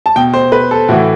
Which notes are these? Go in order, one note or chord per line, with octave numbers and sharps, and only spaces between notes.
A5
B2 G5
C5
B4
A4
A2 E3 F#4